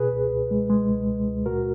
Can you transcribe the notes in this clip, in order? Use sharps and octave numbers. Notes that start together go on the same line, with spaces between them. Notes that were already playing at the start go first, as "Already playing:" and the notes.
Already playing: B2 G#4 B4
C#2
C#2
G#3
G#3
C#2
C#2
C#2
A#2 F#4 A#4